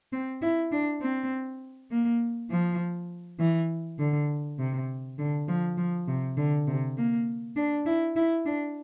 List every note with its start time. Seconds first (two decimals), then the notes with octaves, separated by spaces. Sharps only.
0.12 C4
0.42 E4
0.72 D4
1.01 C4
1.91 A#3
2.50 F3
3.39 E3
3.99 D3
4.59 C3
5.18 D3
5.48 F3
5.78 F3
6.08 C3
6.37 D3
6.67 C3
6.97 A#3
7.56 D4
7.86 E4
8.16 E4
8.46 D4